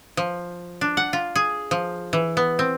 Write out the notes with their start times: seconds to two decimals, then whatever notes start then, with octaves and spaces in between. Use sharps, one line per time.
0.17 F3
0.81 D4
0.97 F#5
1.13 F4
1.36 G#4
1.71 F3
2.13 E3
2.37 B3
2.59 C4